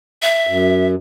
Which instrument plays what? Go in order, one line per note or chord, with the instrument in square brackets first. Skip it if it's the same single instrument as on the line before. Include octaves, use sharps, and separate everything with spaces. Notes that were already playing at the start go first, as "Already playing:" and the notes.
[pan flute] E5
[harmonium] F#2